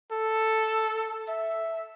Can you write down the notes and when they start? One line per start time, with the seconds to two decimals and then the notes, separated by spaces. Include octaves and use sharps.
0.12 A4
1.28 E5